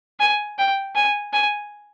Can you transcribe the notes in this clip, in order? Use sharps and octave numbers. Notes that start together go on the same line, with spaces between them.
G#5
G5
G#5
G#5